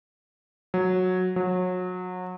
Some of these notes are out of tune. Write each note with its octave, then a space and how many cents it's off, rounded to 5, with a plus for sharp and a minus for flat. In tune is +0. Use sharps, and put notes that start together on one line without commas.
F#3 -10
F#3 -25